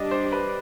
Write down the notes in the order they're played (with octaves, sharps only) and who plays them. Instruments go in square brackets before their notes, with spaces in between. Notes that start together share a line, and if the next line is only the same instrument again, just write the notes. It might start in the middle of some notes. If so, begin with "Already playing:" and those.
Already playing: [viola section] G3 D4 G4 D5 [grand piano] D#5
[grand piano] C5
B4